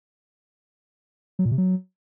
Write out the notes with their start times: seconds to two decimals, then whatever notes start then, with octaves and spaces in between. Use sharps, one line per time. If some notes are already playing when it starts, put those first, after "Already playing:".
1.39 F#3
1.45 A#2
1.51 C3
1.58 F#3